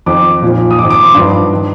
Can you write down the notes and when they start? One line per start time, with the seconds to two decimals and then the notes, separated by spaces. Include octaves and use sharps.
0.06 F2 D#3 D6
0.42 A#2 F3
0.71 D#6
0.79 G#2 D#3 D6
0.90 D6
1.03 C6
1.15 G2 F3
1.53 D#3